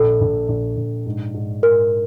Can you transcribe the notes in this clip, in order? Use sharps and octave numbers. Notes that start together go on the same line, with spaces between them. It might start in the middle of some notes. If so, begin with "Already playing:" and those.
Already playing: A#1 A4
A#1
A#1
A#1
G#2
G#2
G#2 A#4